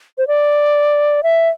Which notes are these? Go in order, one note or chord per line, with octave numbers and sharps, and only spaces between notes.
C5
D5
E5